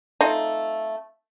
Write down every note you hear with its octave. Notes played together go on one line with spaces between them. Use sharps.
A3 C4 D#4 F4